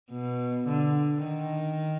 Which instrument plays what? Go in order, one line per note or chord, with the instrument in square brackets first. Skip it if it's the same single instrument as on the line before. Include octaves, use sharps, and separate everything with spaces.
[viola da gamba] B2
D3
D#3